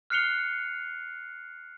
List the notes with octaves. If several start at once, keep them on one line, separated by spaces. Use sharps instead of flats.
F6 F#6 C7 C#7 F7 G7